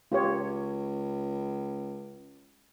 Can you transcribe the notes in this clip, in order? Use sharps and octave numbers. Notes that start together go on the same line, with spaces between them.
C#2 F4 G4 C#5